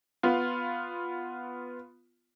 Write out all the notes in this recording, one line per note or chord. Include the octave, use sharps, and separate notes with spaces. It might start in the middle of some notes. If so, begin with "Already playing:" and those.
B3 F4